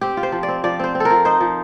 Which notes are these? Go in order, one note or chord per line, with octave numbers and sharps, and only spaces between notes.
C4 G4
F4
C5
F3
D5
C4
F3 D5
C4 C5
C4
A4 A#4
F3
D#4 C5
F3